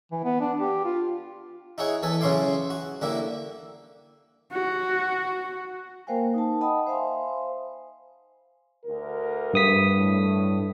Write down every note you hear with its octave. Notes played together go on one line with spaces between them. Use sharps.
E3
B3
D4
G4
F4
D#4 E4 G#4 C#5 F#5
E2 A4 B4 G#5
C#3 F#3 C#4 E4 C6 D6
F#4
D3 G3 A#3 E4
F#4
A#3 A#4 C5 F5 G5 G#5
D#4 A5
D#5 F#5 G5 A5 B5 D#6
C5 E5 F5 G#5 C6
D2 A#4
G2 D#6 B6
A2